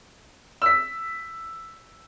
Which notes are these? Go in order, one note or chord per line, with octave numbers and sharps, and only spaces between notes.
E6 B6